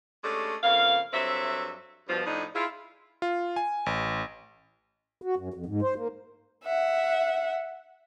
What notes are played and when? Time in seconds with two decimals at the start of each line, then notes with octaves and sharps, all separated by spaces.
0.23 G#3 A3 C#4 D4 G4 A4
0.63 F2 C#3 A#3 F5
1.12 G2 F#3 C4 A4 E5
2.08 G2 B2 F3
2.25 A2 F3 D4 D#4
2.54 E4 F4 G#4
3.22 F4
3.56 G#5
3.86 A1
5.22 F#4
5.36 F#2
5.54 F2
5.66 G#2
5.82 C5
5.96 A#3
6.64 E5 F#5